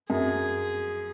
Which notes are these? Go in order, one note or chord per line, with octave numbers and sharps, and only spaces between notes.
F#2 G#4